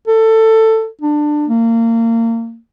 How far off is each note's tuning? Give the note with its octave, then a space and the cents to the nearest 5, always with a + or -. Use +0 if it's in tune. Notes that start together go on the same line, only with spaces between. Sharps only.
A4 +15
D4 +20
A#3 -30